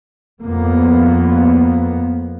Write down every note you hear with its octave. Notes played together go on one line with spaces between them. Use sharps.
F2 A#3 B3